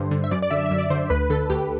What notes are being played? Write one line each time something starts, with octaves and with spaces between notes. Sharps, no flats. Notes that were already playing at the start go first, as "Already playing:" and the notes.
Already playing: G2 D3 C5
D3
E5
F#2 D5
D5
D3 E5
F#2 E5
D5
D3 C5
D2 B4
D3 A4
D2 G4